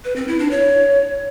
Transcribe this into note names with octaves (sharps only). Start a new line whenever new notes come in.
B4
C4
E4
D4
C#5